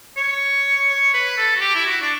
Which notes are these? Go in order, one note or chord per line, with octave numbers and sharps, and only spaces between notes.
C#5
C#5
B4
A4
F#4
G4
E4
F#4
D4